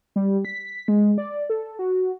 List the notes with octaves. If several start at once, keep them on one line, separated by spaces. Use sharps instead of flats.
G3
B6
G#3
D5
A4
F#4